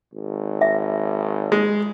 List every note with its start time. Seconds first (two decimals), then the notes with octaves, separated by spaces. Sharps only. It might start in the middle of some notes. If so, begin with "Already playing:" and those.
0.14 G#1
0.61 E5
1.52 G#3